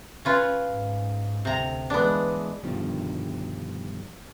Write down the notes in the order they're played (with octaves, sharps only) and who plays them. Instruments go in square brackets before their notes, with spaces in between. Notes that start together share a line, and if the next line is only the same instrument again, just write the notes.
[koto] C#4 F4 B4
[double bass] G#2
[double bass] D2 [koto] C3 A#5
[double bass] E3 G#3 [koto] B3 D4
[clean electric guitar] G2 B2 D3 D#3 F3 G3